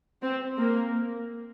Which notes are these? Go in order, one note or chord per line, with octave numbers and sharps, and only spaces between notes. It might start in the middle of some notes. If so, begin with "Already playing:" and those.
C4
A#3